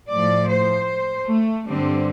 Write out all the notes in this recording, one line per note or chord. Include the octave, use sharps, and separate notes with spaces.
A2 F3 D5
C5
A3
G2 D3 G3 C4